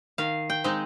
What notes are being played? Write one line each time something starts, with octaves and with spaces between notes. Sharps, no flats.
D#3 F5
G5
G#3 C4 D#4